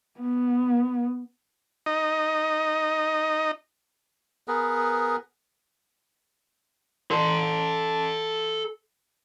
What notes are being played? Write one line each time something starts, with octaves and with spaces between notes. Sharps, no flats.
B3
D#4 D#5
B3 G#4 A#4 B4
A4 C6